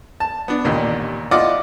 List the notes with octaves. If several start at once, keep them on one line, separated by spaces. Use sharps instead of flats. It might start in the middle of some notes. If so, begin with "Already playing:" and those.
A5
B3 D4
A1 D#2 A#2
E4 F4 D5 D#5 F#5 D6